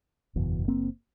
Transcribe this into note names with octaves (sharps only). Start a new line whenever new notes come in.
F#1 E2 B2
A#3 C4